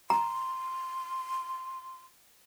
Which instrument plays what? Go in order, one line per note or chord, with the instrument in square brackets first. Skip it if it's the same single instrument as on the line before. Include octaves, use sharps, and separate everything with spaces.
[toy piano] A#5 [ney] C6